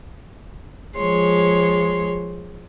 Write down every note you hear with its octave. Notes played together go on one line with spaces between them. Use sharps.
F3 G#3 C#5 C6